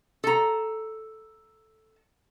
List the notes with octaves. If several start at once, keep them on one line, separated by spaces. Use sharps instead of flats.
A4 A#5